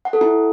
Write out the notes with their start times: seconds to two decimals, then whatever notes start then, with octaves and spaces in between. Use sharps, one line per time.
0.05 F#5
0.13 A4
0.21 E4